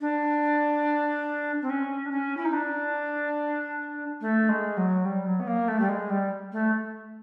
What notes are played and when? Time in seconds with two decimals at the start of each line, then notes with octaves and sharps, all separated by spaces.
0.01 D4
1.62 C4
1.69 C#4
2.05 D4
2.11 C#4
2.37 E4
2.45 D#4
2.53 D4
4.21 A3
4.49 G#3
4.77 F#3
5.05 G3
5.26 F#3
5.40 B3
5.47 A#3
5.68 A3
5.80 G3
5.89 G#3
6.10 G3
6.52 A3